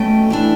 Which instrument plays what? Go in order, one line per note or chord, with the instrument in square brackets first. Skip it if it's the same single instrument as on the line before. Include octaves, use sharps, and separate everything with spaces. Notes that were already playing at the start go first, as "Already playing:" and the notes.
Already playing: [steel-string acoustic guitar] B2 A3 C#4 G5
E3 A3 D4